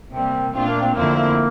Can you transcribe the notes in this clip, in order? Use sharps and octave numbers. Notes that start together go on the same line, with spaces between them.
C3 G3 A#3 C4
A#2 A3 C4 D4 F4
A#3
C4
F2 D3 A3 A#3 C4 E4
A#3